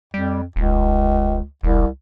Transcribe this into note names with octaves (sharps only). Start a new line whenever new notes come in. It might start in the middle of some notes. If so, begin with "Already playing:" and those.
F2 G3
D#1 C#2
E1 C2